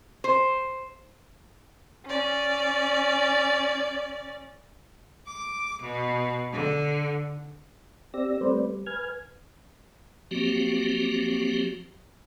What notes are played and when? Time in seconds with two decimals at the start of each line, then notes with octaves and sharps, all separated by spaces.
0.24 C5
2.06 C#4 D5
5.27 D6
5.83 B2
6.53 D3
8.14 C4 G4 D5 E6 A#6
8.41 G3 A3 C4 B4 C5 D5
8.62 G3
8.86 B4 G#5 F6 G#6
10.31 F3 F#3 A#3 C4 F#4 G4